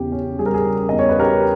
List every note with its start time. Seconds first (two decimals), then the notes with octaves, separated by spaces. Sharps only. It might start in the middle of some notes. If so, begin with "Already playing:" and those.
Already playing: E2 C#3 G4
0.12 C#4
0.39 G3 G#4
0.46 A#4
0.54 G#4
0.66 C#3
0.89 E2 D#5
0.99 C#5
1.09 B4
1.19 C#4 G4 A#4